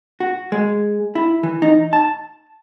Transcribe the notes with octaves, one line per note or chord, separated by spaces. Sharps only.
F#4
G#3
E4
E3
D#4
A5